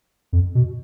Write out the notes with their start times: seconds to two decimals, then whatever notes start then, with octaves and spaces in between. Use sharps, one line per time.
0.33 F2
0.55 B2